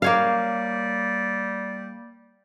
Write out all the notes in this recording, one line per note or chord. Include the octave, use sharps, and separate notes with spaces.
G3 A#3 C#5 F5